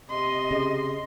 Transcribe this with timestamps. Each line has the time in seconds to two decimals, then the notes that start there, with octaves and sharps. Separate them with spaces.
0.10 C3 D#5 C6
0.51 C#3